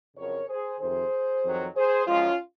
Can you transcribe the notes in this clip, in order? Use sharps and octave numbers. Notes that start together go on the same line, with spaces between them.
F2 C#3 F#3 A#4 C#5
G#4 C5
F2 C3 D#3 G#4 C5
F2 D#3 F#3
G#4 C5
F#2 F3 G#3 C#4 F4